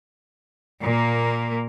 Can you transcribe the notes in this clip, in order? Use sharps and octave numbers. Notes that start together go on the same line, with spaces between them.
A#2 A#3